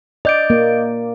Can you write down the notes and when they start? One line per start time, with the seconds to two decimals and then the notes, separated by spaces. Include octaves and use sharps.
0.25 D5 D#5 G6 D7
0.50 A#3